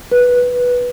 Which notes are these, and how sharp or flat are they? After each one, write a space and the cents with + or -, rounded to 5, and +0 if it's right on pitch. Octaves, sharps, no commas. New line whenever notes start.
B4 -5